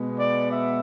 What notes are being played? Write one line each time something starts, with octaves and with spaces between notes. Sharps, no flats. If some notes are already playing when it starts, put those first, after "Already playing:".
Already playing: B2 G#3 B3
D5
E5